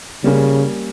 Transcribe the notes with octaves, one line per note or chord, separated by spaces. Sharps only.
C#3 G3 A#3 C#4